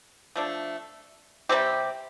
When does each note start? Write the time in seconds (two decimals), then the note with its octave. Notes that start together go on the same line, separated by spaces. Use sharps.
0.36 F3 A3 D4
1.49 C3 G3 C4 G4